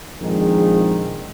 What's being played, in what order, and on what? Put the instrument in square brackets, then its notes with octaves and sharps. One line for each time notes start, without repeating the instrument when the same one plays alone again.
[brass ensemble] A#1 F2 D#3 G#3